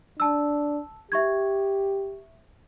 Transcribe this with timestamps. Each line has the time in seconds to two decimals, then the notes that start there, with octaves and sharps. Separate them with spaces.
0.20 D4 A5 E6
1.12 G4 E5 C#6 G#6